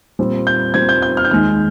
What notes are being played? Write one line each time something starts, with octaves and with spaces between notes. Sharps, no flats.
A#2 G3 C4
G6
A#2 G3 C4 G#6
G6
G6
F6
G6
D#2 D#3 G#3 F6